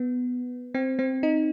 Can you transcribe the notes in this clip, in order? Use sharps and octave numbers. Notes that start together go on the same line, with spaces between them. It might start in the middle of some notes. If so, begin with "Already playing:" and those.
Already playing: B3
C4
C4
D#4